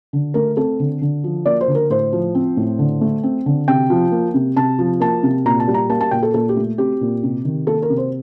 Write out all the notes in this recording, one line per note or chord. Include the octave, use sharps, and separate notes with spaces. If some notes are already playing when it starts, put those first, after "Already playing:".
D3
A3 A#4
C4 A4
D3
D3
F3
A#3 D5
C5
D3
A#4
A2 C5
F3
C4
A2
D3
A3
C4
D3
C3 G5
F3
A#3
C3
C3 A5
F3
A#3 A5
C3
A#2 A#5
A5
G3
A#5
A#3 A5
A5
A#2 G5
A4
A#2 A4
G4
A3
C4 G4
A#2
C3
D#3
A#3 A4
A#4
C3
C5